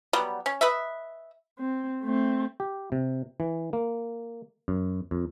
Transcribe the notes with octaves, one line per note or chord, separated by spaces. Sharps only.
F#3 G3 B3
C#4
B4 D#5 E5
C4
A3 C4
G4
C3
E3
A#3
F#2
F2